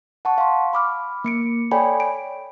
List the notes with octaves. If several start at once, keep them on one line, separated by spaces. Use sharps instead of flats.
F#5 A5 C#6
F5 C6
B5 D6 F6
A#3 C#7 D7
A4 C#5 D5 G5 G#5 B5
D7